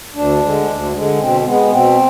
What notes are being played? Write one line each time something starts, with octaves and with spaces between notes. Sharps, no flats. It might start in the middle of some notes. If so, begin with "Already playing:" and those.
D2 D4
D3 G#3
D2
D3 G#3
B2 C4
G#3 B3
B2 C4